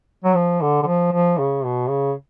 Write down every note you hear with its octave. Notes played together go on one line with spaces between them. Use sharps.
F#3
F3
D3
D3
F3
F3
C#3
B2
C#3